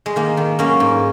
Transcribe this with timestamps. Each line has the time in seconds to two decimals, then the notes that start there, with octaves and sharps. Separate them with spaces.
0.06 G#3
0.16 D#3 A#3
0.37 D#3
0.59 F#3 A#3 C#4
0.80 G#2